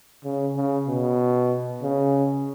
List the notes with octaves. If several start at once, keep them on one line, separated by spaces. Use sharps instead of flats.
C#3
C#3
B2
C#3